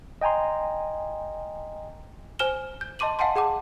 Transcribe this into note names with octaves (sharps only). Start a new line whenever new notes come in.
D#5 G5 G#5 A#5 C6
C5 G#5 F6 E7 G7
G6
D#5 A5 C6 D6 D#7 F#7
D#5 F5 F#5 G#5 A5 C6
G#4 F#5 A5 D6